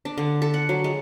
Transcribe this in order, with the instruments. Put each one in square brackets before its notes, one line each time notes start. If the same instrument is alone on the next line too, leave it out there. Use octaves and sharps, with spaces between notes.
[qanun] D4
D3
A4
F#5
F#3
G#3